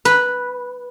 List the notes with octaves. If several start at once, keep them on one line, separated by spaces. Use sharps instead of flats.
B4